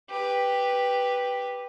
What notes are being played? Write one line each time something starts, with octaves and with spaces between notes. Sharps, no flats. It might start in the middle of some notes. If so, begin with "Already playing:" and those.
G4 B4